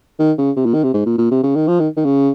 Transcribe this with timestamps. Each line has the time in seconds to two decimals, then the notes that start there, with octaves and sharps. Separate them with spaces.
0.19 D#3
0.38 C#3
0.56 C3
0.66 A#2
0.74 D#3
0.83 C3
0.94 G#2
1.06 A#2
1.18 A#2
1.31 C3
1.43 C#3
1.56 D#3
1.68 F3
1.80 D#3
1.97 D#3
2.05 C#3